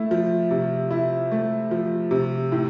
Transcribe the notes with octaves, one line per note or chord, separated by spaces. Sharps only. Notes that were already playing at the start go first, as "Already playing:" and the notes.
Already playing: A3 E4
F3
C3
E4
A3
F3
C3
A2